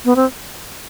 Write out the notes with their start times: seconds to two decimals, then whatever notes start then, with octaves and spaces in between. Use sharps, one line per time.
0.05 B3
0.16 C4